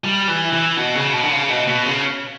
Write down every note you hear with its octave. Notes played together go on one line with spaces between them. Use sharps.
G3
E3
E3
B2
C#3
B2
D3
C#3
B2
B2
C#3